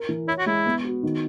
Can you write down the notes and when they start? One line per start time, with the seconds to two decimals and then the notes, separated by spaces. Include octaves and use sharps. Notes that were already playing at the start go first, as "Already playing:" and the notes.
Already playing: A#4
0.09 E3
0.27 E4 C#5
0.38 F#4
0.46 G#3 E4
0.66 B3
0.84 F#4
1.03 D#3